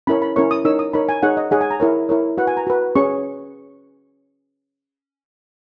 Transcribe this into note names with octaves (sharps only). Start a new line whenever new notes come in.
C#4 E4 A#4 C#5 B5
B5
C#4 E4 A#4 C#5 C#6
D#6
D#4 A#4 C#5 E6
D#6
D#4 A#4 C#5 B5
G#5
D#4 G#4 C#5 F#5
D#5
D#4 G#4 C#5 F#5
G#5
A#5
E4 A#4 C#5
E4 A#4 C#5
F#4 B4 F#5
G#5
A#5
F#4 B4
C#4 G#4 C#5 C#6